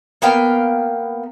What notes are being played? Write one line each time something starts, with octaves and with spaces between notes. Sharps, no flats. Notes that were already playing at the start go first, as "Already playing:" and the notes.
A#3 B3 F5 G5